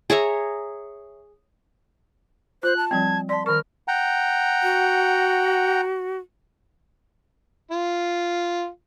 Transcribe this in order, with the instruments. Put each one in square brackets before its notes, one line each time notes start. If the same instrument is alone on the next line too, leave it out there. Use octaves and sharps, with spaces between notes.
[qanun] G#4 C#5 E5 A#5
[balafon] F4 [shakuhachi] C5 [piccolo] F#6
[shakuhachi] A5
[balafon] F3 G3 C4 [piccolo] G#6
[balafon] D5 A5 [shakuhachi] C6 [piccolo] B6
[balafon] D#3 C#6 [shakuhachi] A#4 [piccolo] F6
[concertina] F#5 G5 A#5
[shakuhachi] F#4
[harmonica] F4